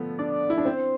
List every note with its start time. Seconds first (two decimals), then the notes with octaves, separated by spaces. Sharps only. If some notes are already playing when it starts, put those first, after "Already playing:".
Already playing: D3 F3 A3 B3
0.19 D4 D5
0.50 E4
0.58 D4
0.65 C4 C5